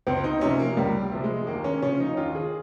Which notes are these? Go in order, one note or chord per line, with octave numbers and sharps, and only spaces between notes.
C#2 C4
D#4
C3 F3 C#4
A#3
C#2 G3
C3 F3
G#3
D#2 A#3
C#4
C#3 F3 C#4
D#4
D#2 F4
G#4